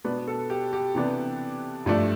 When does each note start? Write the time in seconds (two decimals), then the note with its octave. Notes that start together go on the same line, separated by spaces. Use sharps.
0.04 B2 B3 D4 B4
0.27 A4
0.50 G4
0.73 G4
0.95 C3 E3 B3 D4
1.86 G2 F3 A3 D4